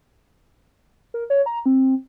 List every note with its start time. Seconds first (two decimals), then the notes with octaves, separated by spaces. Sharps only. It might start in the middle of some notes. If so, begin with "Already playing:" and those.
1.14 A#4
1.30 C#5
1.46 A#5
1.66 C4